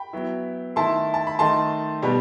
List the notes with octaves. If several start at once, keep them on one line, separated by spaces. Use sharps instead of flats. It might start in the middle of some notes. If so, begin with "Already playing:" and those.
Already playing: G5 B5
F#3 B3 E4
D#3 A3 E4 A5 C6
A5
B5
D#3 A3 D#4 A5 C6
B2 G3 B3